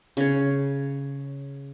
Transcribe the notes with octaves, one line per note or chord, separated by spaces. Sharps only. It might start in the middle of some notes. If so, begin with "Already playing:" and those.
C#3 C#5